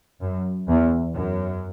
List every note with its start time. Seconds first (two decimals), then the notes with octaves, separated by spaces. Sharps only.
0.21 F#2
0.68 E2
1.15 F#2